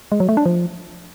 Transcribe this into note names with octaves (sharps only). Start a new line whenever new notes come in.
G#3
F#3
A3
D4
F3